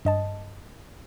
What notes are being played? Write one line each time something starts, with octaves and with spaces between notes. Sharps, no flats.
G2 D#5 A5